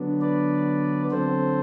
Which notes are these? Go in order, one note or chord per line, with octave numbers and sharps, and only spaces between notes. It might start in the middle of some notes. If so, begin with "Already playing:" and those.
Already playing: D3 F#3 B3 D4
B4 D5
D3 F#3 C4 A4 C5